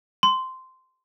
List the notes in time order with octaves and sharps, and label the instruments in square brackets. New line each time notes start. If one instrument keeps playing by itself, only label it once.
[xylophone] C6